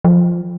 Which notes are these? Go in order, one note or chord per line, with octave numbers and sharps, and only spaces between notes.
F3